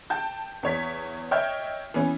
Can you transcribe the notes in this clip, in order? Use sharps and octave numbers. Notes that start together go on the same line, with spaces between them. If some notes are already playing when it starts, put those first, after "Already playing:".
G5 A5 G6
E2 C#5 B6
C#5 D#5 E5 G5 F6 G6
E3 B3 C#4